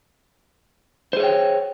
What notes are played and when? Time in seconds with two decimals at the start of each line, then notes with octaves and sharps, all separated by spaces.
1.13 C5
1.17 G#4
1.20 C#5
1.23 G5